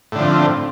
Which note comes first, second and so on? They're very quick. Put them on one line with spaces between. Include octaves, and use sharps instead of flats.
A2 D3 F3 C4